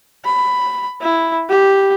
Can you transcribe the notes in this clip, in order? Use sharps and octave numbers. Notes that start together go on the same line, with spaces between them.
B5
E4
G4